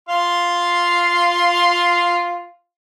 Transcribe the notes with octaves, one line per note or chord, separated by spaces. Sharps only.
F4 F5 C6